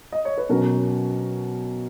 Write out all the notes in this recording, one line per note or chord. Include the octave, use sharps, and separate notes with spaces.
D#5
C#5
B4
B2 F#3 C#4 A#4